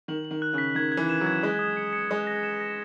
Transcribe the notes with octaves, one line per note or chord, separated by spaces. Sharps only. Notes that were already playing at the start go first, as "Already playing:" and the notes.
D#3 F#7
F#7
D#3
F#6
C#3
B6
D#3 G#6
G#6
E3
E7
F#3
G#6
G#3 D#6
D#6
C#7
C#7
G#3 D#6
A#6
E7
A#6